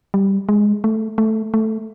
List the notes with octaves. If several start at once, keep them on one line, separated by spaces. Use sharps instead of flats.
G3
G#3
A3
A3
A3